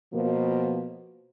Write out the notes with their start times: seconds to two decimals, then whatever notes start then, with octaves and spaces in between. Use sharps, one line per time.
0.13 B2 F3 A#3